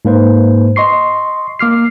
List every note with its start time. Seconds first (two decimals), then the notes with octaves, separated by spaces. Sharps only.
0.05 G#2 A#3 B4 C5
0.76 D#5 C6 C#6 C7
1.59 A#3 D6 F6 C7